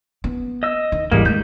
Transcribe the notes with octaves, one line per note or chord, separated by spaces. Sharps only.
B3
D#5 E6
D#3
G#1 E3 G3 G#3 A#3
D#3 G#3 A3 D#4 G6